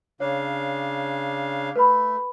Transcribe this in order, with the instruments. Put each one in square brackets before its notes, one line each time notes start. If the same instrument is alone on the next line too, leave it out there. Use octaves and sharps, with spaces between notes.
[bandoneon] C#3 D4 F5 [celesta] C#5
[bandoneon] A3 [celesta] B4 B5